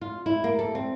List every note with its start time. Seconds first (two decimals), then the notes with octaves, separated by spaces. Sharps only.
0.01 F4
0.26 E4
0.44 A#3
0.59 A4
0.75 C4